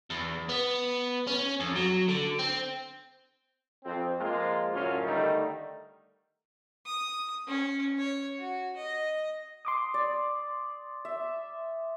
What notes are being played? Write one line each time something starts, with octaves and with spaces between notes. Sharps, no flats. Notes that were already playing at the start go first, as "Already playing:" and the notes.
E2
B3
C#4
F2
F#3
D3
C4
F2 C4
F3 G#3 A#3 F4
F#2 A2 D3 C#4 F4
D3 D#3 G3 A3 D#4
D#6
C#4
C#5
F#4
D#5
C6 D6 D#6
D5
E5